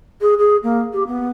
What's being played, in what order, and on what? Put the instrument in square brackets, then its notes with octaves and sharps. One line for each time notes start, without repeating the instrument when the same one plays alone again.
[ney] G#4
G#4
A#3
G4
B3